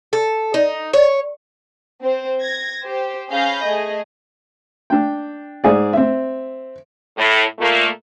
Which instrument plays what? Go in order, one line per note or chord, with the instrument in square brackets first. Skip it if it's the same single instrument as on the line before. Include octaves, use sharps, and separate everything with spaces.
[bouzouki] A4
D#4
C#5
[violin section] C4 C5
G#6 A#6
G4 C5
C#4 G#4 F5 B5 G6 A#6
A3 G#4 D#5
[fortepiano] D4 G5
G#2 G#4 D5
C4 E5
[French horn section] A2
A#2 A3 A#3